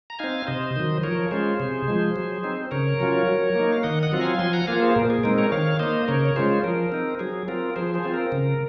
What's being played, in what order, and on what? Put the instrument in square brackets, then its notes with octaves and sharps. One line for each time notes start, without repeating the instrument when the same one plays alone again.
[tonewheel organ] A#5
C4 D#4 F5 G#5
C3 C5 D#5
D#3 F#3
F3 A#4 C#5
G#3 C#4 F4 G#4 C5
C3
F3 G#3
F#3
C4 D#4
C#3 A#4 C#5
F#3 C#4 F4
F#3
A#3 D#4
F5
D#3 D#5 F#5
D#5 F#5
F#3 C4 F4
F5 G#5
F3 G#5 C6
F#5 A#5
A#3 F4 F5 G#5
G#4 C5
A#2 A#4
G#4
G#3 C4 D#4 A#4
A#4 C#5
D#3 C#5 F5
A#3 D#4 C5 D#5
C#3 A#4 C#5
C#5
G#3 C#4 F4 G#4 C5
F3 A#4
C4 D#4
F#3 G#4
C4 F4 A#4
F3 G#4 C5
G#4 C5
C4 F4
A#4
C#3